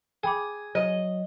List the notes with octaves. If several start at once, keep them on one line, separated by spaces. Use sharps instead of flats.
G#4 G5 B5 D6
F#3 D#5